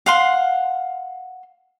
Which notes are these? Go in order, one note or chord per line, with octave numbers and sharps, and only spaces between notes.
F5 F#5 C6